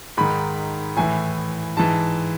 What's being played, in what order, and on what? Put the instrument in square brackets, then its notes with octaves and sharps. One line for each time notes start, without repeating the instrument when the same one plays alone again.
[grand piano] G#2 D#3 B5
A2 E3 G#5
G#2 E3 A5